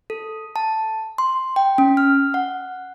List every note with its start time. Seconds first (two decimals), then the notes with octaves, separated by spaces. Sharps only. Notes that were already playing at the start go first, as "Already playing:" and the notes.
0.10 A4
0.56 A5
1.18 C6
1.56 G5
1.78 C#4
1.97 F6
2.34 F#5